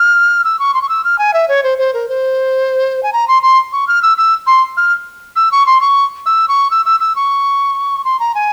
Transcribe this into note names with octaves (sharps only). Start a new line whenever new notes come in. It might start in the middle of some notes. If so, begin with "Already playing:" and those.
Already playing: F6
E6
C#6
C6
C#6
E6
F6
G#5
E5
C#5
C5
C5
A#4
C5
G#5
A#5
C6
C6
C#6
F6
E6
E6
C6
F6
E6
C#6
C6
C#6
E6
C#6
E6
E6
E6
C#6
C6
A#5
G#5